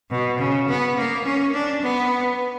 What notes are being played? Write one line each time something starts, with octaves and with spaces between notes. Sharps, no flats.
B2
C#3
B3
A#3
C#4
D4
B3